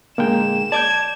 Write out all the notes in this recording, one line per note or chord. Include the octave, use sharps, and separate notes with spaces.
A#2 D3 G#3 A#3 G5 E7
D5 A5 D6 G6 G#6